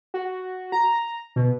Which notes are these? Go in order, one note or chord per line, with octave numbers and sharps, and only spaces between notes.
F#4
A#5
B2